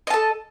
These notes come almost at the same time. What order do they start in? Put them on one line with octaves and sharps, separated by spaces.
D#5 A5 A4